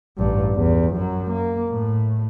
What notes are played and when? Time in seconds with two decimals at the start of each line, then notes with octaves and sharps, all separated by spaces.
0.18 A1 G2
0.55 E2
0.93 F#2 F#3
1.30 A#3
1.70 A2